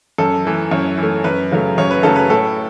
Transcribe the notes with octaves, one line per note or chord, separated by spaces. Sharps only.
F#2 A4
E3 A3
F#2 C#5
E3 A3
F#2 B4
C#3 F#3 A3
F#2 C#5
B4
C#3 F#3 A3 A4
B4
A2 A4